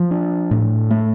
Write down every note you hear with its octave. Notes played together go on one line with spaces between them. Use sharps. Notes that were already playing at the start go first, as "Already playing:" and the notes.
Already playing: F3
D4
A2
A3